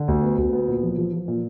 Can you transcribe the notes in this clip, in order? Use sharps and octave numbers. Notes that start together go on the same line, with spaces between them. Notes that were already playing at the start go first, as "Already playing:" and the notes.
Already playing: D3
D2
B3
D2
B3
A#2
F3
F3
F3
A#2